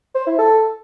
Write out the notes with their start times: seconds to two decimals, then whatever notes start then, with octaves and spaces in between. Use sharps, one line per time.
0.15 C5
0.27 E4
0.39 A4